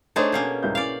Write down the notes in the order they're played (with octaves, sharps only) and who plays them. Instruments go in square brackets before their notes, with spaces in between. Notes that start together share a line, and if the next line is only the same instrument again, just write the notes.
[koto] A3 D4 G#4 [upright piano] D#4 C5 C#5
[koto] B2 A#3 C#4 [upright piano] G6 C7
[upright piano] C2 G#2 G6
[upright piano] C#4 E4 [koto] D5 F5